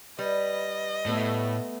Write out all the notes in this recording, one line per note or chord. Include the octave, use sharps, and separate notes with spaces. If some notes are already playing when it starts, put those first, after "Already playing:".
G3 B4 D#5
A2 A3 B3